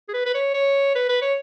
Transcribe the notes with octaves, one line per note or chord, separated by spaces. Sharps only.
G#4
B4
B4
C#5
C#5
B4
B4
C#5